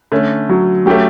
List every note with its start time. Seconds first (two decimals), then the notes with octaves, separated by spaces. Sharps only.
0.12 D3 A3 C#4
0.49 F#3
0.86 F#3 A3 C#4 G4